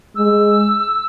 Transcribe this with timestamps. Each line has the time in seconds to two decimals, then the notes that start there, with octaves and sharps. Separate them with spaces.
0.15 G#3 E6